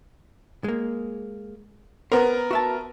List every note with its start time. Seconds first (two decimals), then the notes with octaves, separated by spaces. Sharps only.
0.64 G#3 A#3
2.12 B3 A#4 C5
2.51 F#4 E5 A5